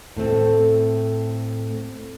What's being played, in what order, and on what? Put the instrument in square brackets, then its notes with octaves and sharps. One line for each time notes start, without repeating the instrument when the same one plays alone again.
[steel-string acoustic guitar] A2 A3 C4 A4